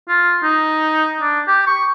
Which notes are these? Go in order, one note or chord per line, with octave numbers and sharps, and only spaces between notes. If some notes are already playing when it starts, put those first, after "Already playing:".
F4
D#4
D4
G4
C#6